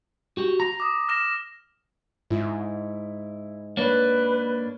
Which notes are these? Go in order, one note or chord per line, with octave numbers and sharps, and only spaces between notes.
F#4 G4
A#5 A#6
D6 D#6
F6 A#6 E7
G#2 E4
A#3 D4 B4 C#5